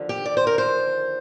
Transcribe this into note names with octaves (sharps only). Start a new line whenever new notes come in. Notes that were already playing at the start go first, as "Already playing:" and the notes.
Already playing: D#2 D3 F3
G4
D5
C5
A#4
C5